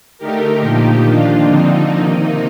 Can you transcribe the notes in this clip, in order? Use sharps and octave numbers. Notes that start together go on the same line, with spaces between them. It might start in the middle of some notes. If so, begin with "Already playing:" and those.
D3 A3 D#4 G4 A#4
A#2 F3 A#3 D#4 G4
D#3 A#3 D4 F4
D3 F3 C4 D#4
C3 D#3 A#3 D#4